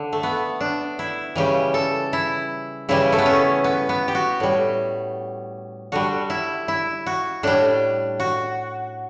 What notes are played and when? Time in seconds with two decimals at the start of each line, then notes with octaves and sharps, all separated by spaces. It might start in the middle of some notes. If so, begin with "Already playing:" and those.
Already playing: D3
0.13 A3
0.23 B3
0.60 D4
0.99 E4
1.36 C#3 E3 G3 G4
1.74 A4
2.13 E4
2.89 C#3 E3 G3 E4
3.12 A3
3.19 B3
3.26 C#4
3.64 B3
3.89 B3
4.08 G4
4.15 F#4
4.40 A2 G3
5.92 D3 G3 F#4
6.30 E4
6.68 E4
7.06 F#4
7.43 A2 G3 D4
8.20 F#4